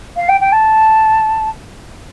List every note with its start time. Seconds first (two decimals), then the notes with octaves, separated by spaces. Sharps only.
0.16 F5
0.28 G5
0.40 G5
0.52 A5